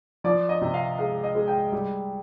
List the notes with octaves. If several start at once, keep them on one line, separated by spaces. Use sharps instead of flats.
F3 D5
D#5
C3
F5
G#3 F5
D#5
G#3
G5
G3